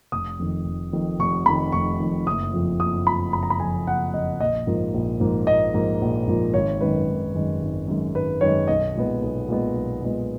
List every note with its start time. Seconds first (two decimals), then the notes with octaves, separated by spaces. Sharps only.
0.12 F1 D#6
0.39 F2 D#3
0.65 F1
0.93 F2 D#3
1.19 F1 C#6
1.46 F2 D#3 B5
1.72 F1 C#6
1.99 F2 D#3
2.27 F#1 D#6
2.53 F2 F3
2.80 F#1 D#6
3.06 F2 F3 B5
3.33 F#1 B5
3.43 A#5
3.50 B5
3.60 F2 F3 G#5
3.86 F#1 F#5
4.13 F2 F3 D#5
4.40 A#1 D#5
4.67 G#2 F3 A#3
4.94 A#1
5.20 G#2 F3 A#3
5.47 A#1 D#5
5.74 G#2 F3 A#3
6.01 A#1
6.27 G#2 F3 A#3
6.54 G#1 C#5
6.81 F#2 D#3 G#3 B4
7.07 G#1
7.34 F#2 D#3 G#3
7.61 G#1
7.88 F#2 D#3 G#3
8.15 G#1 B4
8.41 F#2 D#3 G#3 C#5
8.68 B1 D#5
8.96 A#2 G#3 B3
9.22 B1
9.48 A#2 G#3 B3
9.75 B1
10.02 A#2 G#3 B3